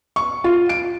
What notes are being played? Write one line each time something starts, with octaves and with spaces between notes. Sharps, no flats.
C#6
F4
D7